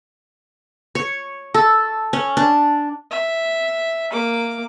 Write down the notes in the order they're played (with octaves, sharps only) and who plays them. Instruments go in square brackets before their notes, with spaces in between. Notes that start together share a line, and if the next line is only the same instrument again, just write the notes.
[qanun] C#5
A4
C#4
D4
[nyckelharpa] E5
A#3 D6